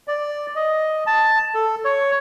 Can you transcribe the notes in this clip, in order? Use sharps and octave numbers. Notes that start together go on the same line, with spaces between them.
D5
D#5
A5
A4
C#5